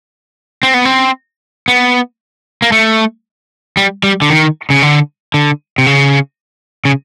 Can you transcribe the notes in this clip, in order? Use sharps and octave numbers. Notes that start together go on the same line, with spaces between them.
C4
B3
C4
B3
A#3
A3
G3
G3
D3
D#3
C#3
D3
D3
C3
C#3
C#3